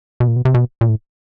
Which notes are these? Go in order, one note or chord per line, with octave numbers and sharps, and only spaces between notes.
B2
A#2
B2
C3
B2
A#2
A2